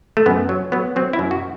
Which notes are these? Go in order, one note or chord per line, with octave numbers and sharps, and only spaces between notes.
A3
F#2 B3
F#3
F#3 B3
F#3 C4
E4
F#2
F#4